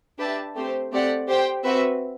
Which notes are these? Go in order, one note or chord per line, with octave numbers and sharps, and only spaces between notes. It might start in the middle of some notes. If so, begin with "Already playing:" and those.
D4 G4 B4 E5 A5
A3 C4 G4 C5
A3 C4 G4 D5 F#5
G4 C5 G5
C4 F#4 B4 E5